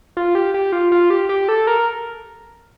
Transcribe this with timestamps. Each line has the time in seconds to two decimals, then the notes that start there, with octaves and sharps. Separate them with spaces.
0.17 F4
0.35 G4
0.54 G4
0.72 F4
0.92 F4
1.10 G4
1.29 G4
1.48 A4
1.67 A#4